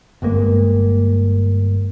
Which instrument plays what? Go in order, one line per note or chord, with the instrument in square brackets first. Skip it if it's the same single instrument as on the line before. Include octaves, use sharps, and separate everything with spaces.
[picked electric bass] G1 G2 G#3 A#3